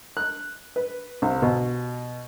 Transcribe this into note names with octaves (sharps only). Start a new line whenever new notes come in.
F#6
B4
C2
B2